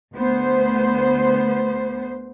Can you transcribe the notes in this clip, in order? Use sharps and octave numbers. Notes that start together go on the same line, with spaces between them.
D2 B3 C5